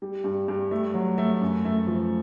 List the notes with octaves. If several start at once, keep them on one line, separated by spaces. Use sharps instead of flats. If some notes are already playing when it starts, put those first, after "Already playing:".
G3
G2
G2
A3
F#3
A3
F#2
A3
F3